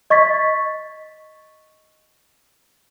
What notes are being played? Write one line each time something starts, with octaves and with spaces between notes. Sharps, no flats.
D#5 C#6 A6 B6